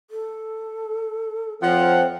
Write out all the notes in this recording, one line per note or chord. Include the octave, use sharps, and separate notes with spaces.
A4
F2 F3 C4 C#5 F#5